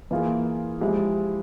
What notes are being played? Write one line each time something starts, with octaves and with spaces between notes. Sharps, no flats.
E3 A#3 F4 G#4
F3 G#3 E4 G4